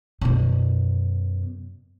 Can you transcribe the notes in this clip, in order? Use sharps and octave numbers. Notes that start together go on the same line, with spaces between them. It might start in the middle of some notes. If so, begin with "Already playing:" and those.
F#2 B2